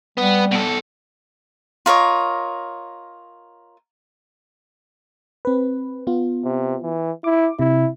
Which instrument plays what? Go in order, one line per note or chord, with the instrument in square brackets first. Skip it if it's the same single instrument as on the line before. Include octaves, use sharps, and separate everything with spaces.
[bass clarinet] G3 [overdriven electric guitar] B3
[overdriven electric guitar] B2 A4
[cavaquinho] F4 A#4 C#5 D#5
[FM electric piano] C4 B4
B3 F4
[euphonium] C3
E3
[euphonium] E4 [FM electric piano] D6
[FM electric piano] C3 [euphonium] E4